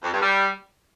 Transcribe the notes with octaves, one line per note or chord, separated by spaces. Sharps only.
F2
G2
G3